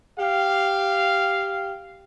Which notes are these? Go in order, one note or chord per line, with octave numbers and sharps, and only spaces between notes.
G4 F5